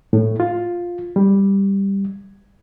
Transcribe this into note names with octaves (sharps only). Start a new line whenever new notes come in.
A2
F4
G3